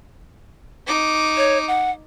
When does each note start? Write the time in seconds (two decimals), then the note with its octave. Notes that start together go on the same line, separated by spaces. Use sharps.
0.87 D#4 D6
1.37 C#5
1.68 F#5